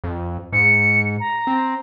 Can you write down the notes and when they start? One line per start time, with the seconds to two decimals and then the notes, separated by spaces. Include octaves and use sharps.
0.04 F2
0.53 G#2 C#7
1.19 A#5
1.47 C4